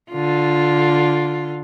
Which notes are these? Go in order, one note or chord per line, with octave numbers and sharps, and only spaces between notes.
D3 F4